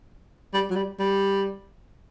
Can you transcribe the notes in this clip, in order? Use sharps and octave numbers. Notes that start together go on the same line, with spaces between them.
G3
F#3
G3
G3